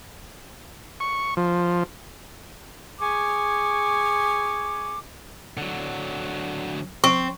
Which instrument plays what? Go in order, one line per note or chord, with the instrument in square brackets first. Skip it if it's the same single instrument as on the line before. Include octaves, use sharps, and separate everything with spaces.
[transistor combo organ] C#6
F3
[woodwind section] G#4 G#5 C#6 D6
[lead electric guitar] D3 F#3
[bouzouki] C4 [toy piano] C#6